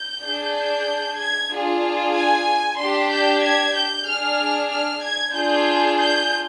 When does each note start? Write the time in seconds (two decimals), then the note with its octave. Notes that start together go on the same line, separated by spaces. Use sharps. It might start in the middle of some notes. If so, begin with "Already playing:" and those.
Already playing: G6
0.23 D4 G#4
0.56 G6
1.19 G#6
1.51 D4 F4 G#4
2.15 G#5
2.78 D4 G4 C6
3.11 G6
3.42 G#6
3.75 G6
4.06 D4 G#4 F6
4.70 F6
5.02 G#6
5.34 D4 F4 G#4 G6
5.98 G6